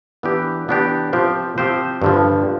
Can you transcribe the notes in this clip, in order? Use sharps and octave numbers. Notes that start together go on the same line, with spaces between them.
E3 B3 D4 G4
E3 B3 D4 G4
F3 C4 G4 C5
F3 C4 G4 C5
G2 D3 F3